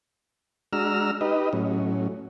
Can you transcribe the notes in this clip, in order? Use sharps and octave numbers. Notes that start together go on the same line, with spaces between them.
G#3 D4 F#4 A#5 E6 F6
D#4 G4 B4 D#5
A2 F#3 C#4